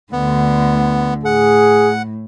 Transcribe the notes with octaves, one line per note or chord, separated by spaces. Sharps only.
D2 D3 B3
A2 G#4 F#5